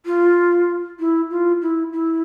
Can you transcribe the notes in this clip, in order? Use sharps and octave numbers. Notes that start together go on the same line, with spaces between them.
F4
E4
F4
E4
E4